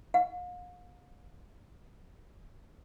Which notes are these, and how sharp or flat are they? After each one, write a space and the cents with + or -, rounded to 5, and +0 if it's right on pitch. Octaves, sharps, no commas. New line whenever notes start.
F5 +40